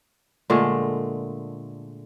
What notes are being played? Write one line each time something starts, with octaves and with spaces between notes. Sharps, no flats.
A#2 D3 G#3 A3